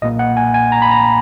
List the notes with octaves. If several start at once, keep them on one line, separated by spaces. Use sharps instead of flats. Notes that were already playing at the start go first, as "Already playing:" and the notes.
B1 A#2 A#3 D#5
F#5
G#5
G#5
A#5
B5
A#5